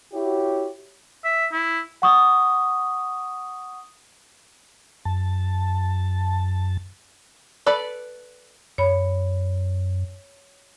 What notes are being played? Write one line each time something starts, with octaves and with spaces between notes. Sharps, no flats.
E4 F#4 G4 C#5
E5
E4
F#5 C#6 D#6
F#2 A5
A4 B4 D5 B5
F#2 C#5 B5